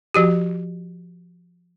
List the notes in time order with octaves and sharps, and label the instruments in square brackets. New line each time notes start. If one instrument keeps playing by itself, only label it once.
[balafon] F3 F#4 G4